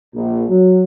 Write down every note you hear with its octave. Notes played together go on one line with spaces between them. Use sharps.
A#1
F#3